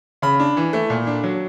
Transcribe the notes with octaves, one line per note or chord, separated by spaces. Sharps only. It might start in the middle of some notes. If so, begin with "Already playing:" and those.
C#3 B5
D4
E3
A3
A#2
D4
F#3